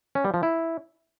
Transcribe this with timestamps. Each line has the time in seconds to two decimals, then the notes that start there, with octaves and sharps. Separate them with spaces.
0.15 C#4
0.25 G3
0.34 F3
0.43 E4